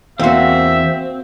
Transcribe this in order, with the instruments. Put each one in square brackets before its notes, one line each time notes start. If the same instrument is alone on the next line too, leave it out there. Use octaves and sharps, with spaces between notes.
[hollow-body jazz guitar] E2 C5 [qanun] A#3 F#4 [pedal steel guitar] C4 [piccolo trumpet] E5